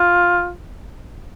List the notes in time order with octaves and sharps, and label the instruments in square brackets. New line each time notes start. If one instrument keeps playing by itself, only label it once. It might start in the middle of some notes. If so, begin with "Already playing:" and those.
Already playing: [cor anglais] F4